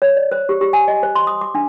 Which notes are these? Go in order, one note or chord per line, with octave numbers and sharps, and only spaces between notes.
C#5
D5
C5
G4
G4
G#5
D#5
C5
C6
D#6
D6
D4